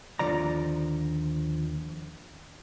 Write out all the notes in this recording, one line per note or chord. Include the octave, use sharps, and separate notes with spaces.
D#2 D3 E3 F3 D5 A#5